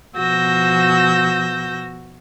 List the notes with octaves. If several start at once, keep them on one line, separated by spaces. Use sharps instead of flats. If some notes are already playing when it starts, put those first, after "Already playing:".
B2 F3 F#4 E6 G6 A#6